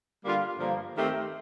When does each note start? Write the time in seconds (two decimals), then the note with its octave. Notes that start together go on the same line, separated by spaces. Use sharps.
0.24 D3 G3 A#3 F4
0.59 G2 D3 F3 A#3
0.96 D#3 A3 C4 G4